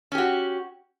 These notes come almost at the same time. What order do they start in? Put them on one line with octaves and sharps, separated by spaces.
C#4 G4 F#4